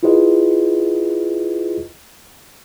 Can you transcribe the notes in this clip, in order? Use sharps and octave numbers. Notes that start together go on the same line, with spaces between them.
E4 F4 G#4 B4 D#5